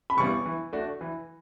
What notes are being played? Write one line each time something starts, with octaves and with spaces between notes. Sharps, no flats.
B5
C#3 E3 G3 B3 C#6
E3
A3 D4 F#4
E3